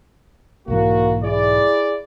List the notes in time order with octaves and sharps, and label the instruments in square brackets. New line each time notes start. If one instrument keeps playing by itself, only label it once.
[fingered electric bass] B1 G#2 E3 [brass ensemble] A#3 F#4
[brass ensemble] E4 G#4 D5